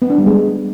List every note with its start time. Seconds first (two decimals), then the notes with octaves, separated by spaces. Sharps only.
0.02 B3
0.10 D4
0.18 G3
0.26 G#3